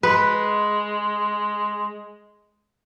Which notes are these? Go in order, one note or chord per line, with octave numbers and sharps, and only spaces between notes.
G#3 B4